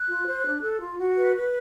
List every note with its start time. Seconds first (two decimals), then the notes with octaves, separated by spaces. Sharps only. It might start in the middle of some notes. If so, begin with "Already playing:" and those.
Already playing: F#6
0.09 F4
0.27 C5
0.45 D4
0.63 A4
0.81 F4
0.99 F#4
1.17 B4
1.35 B4